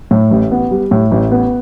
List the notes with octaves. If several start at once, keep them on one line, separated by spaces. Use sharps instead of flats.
A2
A1
B3
G3
A2
A1
B3